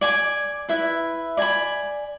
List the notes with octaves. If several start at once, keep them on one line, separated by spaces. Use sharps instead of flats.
D5 G#5 D6
E4 B4 E5
D5 G#5 B5